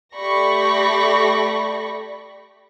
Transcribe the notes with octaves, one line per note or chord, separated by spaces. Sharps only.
A3 G4 D5 B5 C#6 A#6